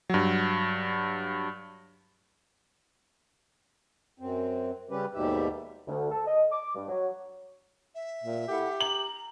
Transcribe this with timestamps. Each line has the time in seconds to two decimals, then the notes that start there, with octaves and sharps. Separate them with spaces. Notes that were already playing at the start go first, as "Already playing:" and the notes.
0.10 G2 F#3
4.20 F#2 C4
4.90 C#3 G3 C#4 G4 B4
5.14 D#2 G#2 B2 G3 G4 E5
5.87 D2
6.11 A4
6.26 D#5
6.52 D6
6.75 G2
6.88 F#3
7.95 E5
8.23 A#2
8.48 E4 G4 A4 F#5
8.81 A#5 F#7